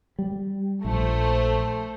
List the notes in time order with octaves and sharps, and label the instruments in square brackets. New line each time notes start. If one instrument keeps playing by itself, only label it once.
[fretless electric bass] G3
[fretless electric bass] A#1 [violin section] A3 C5